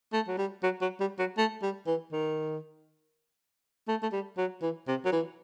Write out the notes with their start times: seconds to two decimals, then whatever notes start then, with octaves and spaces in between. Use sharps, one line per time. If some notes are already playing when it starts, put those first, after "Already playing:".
0.13 A3
0.28 F#3
0.38 G3
0.63 F#3
0.82 F#3
1.00 G3
1.19 F#3
1.38 A3
1.63 G3
1.87 E3
2.12 D#3
3.88 A3
4.03 A3
4.13 G3
4.38 F#3
4.62 E3
4.88 C3
5.05 F#3
5.13 E3